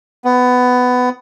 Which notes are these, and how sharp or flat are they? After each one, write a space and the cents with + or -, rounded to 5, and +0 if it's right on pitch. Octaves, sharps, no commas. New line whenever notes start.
B3 +15